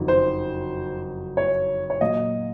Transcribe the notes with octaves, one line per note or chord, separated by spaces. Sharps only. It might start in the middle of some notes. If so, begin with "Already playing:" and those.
Already playing: F#1 F2 D#3 F#3
C5
C#5
C#5
A#2 F#3 A#3 D#5